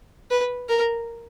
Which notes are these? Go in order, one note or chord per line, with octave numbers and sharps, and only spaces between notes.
B4
A#4